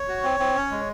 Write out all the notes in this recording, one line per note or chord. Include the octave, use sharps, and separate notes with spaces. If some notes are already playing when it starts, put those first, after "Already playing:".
Already playing: C#5
F#4
C4
C4
C#4
G#3